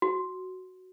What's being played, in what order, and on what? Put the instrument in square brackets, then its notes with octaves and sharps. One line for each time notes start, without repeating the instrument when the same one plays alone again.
[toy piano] F#4